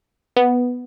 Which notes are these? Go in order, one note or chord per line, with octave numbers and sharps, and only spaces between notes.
B3